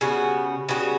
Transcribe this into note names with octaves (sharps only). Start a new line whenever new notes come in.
C#3 G3 B3 F#4
C#3 G3 B3 F#4